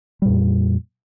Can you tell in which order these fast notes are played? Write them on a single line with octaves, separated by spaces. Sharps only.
G3 A#2 F2